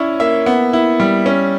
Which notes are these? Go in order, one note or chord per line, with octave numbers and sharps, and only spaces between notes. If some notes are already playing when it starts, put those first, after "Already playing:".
Already playing: C#4 E4 C#5 D5
A#3 E5
B3
E4
G3
C#4